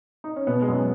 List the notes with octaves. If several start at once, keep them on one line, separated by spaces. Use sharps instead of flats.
D#4
C#4
B2 B3
G#3
F#2 F#3